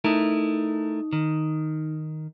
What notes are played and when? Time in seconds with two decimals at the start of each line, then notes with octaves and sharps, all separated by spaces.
0.04 A3 D#4 E4 A#4 D#6
1.13 D#3